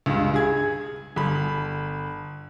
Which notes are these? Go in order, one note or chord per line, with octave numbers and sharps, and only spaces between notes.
C#2 G2
G#4 G#6
G1 B5